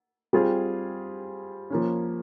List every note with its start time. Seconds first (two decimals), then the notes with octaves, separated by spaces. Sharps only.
0.33 G3 C4 F4 G#4
1.70 F3 A#3 C#4